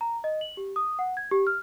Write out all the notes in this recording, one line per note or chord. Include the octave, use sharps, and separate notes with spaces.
A#5
D#5
F#7
G4
D#6
F#5
G#6
G4
F6